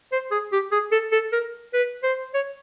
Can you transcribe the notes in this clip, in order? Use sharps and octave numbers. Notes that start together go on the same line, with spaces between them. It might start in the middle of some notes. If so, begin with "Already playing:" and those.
C5
G#4
G4
G#4
A4
A4
A#4
B4
C5
C#5